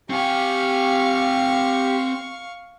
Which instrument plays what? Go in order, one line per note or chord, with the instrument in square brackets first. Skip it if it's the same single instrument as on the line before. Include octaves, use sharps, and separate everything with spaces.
[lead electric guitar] C4 G#5 [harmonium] G4 [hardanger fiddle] F5 C#6